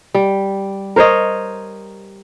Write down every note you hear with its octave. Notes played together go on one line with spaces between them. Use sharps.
G3
A#4 C5 C#5 D#5